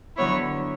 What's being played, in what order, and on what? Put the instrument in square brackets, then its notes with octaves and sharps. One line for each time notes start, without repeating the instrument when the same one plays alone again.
[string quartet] D3 F#3 B3 E4 C#5